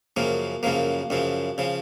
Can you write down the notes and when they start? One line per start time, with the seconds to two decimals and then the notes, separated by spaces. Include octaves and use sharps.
0.16 F#2 C#3 F3 A#3
0.63 F#2 C#3 F3 A#3
1.10 F#2 C#3 F3
1.58 C#3 F3